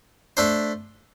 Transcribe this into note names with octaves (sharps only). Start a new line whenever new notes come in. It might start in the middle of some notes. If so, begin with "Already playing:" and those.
A3 D4 A4 C5